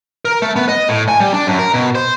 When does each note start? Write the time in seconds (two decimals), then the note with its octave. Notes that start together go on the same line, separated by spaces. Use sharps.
0.25 A#4
0.42 A3
0.56 B3
0.69 D#5
0.89 A2
1.09 G#5
1.20 G3
1.34 D4
1.47 F#2
1.59 A#4
1.74 B2
1.95 C5